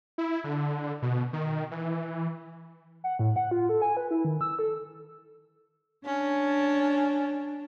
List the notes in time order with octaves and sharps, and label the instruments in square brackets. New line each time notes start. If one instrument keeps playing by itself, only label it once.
[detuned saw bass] E4
D3
B2
D#3
E3
[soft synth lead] F#5
A2
F#5
F4
A4
G#5
B4
E4
D#3
E6
A4
[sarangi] C#4 [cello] D4